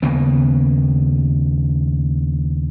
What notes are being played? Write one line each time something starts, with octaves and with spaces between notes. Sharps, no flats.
D#2 C#3 A#3 B3